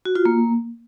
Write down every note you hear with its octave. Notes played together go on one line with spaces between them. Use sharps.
F#4
F4
A#3